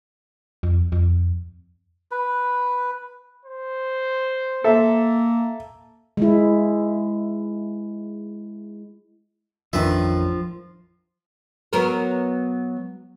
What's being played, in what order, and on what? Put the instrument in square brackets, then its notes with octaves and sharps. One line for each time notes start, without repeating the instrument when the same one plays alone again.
[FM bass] F2
F2
[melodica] B4
[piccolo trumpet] C5
[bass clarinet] A#3 [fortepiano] A4 E5
[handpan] G#3 E4
[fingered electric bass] A1 F2 D4 [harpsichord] D#3 B4 E5 [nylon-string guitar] F3
[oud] F#3 B3 A#4